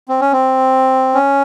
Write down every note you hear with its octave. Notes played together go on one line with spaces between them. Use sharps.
C4
C#4
C4
C#4